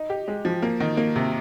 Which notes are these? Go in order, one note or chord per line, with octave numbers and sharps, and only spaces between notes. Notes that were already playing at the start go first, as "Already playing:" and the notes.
Already playing: D#4
G4
G#3
F3
A#3
D#3
A#3
C3